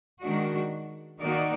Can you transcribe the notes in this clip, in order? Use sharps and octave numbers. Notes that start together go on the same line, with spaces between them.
D#3 G#3 D4 F#4
D#3 A#3 D#4 F#4 D5